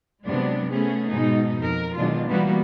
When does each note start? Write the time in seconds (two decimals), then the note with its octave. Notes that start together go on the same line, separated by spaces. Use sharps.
0.25 C3 F#3 G#3 B3 D4
0.71 A3 B3 C#4 G#4
1.10 G#2 B2 D#4
1.58 F2 A#4
1.97 B2 D#3 F#3 G#3 D4 F4
2.28 E3 G3 A#3 B3 F#4